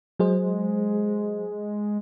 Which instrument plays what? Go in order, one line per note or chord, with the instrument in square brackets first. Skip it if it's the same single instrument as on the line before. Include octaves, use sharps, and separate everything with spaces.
[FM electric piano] F#3 G#4 C5 [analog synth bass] G#3